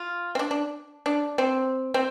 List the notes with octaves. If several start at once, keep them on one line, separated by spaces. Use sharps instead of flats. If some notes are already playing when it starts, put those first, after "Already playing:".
Already playing: F4
C4
D4
D4
D4
C4
C4